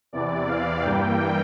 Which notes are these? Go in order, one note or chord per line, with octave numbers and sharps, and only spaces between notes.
E2 C3 E3 D5
F5
G2 E3 G3 A#3 G5